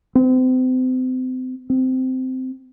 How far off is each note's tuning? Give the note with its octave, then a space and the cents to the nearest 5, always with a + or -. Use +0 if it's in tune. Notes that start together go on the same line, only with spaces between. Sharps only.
C4 -35
C4 -15